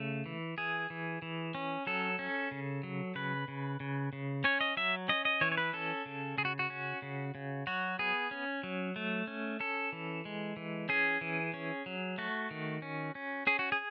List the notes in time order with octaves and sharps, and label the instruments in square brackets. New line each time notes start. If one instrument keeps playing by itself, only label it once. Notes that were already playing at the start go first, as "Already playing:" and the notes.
Already playing: [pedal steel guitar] C#3 A3
E3
E3 G#4
E3
E3
C#4
F#3 A4
C#4
C#3
F#3
C#3 B4
C#3
C#3
C#3
C#4 C#5
D#5
F#3 E5
C#4 D#5
D#5
E3 C#5
C#5
B4
C#4 A4
C#3
C#3 G#4
F#4
F#4
C#4
C#3
C#3
F#3 F#4
B3 G#4
C#4
F#3
A3
C#4
C#4 A4
E3
G#3
E3
C#4 G#4
E3
C#4
F#3
A3 F#4
D#3
C#4
C#4
C#4 G#4
F#4
G#4